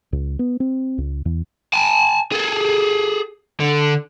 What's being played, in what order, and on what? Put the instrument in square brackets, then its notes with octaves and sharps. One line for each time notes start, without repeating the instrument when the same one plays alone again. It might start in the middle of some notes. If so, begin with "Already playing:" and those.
[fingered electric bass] C#2
B3
C4
C#2
E2
[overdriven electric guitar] G#5 A5
G#4 A4
D3